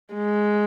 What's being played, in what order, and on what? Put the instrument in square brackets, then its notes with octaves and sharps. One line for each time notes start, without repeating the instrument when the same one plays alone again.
[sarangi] G#3